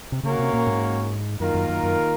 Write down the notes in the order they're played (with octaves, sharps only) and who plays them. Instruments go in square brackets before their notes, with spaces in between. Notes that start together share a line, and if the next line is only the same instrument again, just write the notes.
[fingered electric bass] C3
[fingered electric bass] C#3 [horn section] A#3 C#4 F#4 A#4 C#5
[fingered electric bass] C3
A#2
G#2
[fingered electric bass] F#2 [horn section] D#3 A#3 F4 A#4
[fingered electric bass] F#2
F#2
F#2